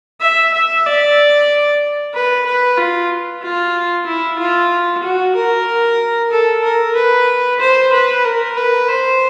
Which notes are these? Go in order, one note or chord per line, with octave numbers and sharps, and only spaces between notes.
E5
E5
D5
B4
B4
F4
F4
E4
F4
F#4
A#4
A4
A#4
B4
C5
B4
A#4
B4
C5